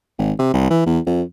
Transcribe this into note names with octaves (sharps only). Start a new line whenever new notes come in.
G#1
C3
C2
E3
E2
F2